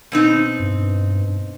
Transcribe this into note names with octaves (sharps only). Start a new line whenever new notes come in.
B2 C4 D#4
G2